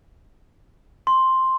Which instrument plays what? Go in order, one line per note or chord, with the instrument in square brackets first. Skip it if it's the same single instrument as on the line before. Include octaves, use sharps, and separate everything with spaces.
[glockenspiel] C6